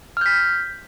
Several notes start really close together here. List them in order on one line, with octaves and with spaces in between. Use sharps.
F6 G6 B6